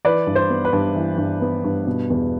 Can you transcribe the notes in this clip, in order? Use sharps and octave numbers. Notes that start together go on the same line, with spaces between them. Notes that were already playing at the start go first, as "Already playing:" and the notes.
E3 B4 D5
G2
C5
B3
B4
G2
E3
G2
B3
G2
B2
E2